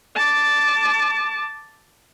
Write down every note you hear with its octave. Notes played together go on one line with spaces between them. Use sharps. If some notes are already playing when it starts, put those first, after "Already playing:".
A5 D6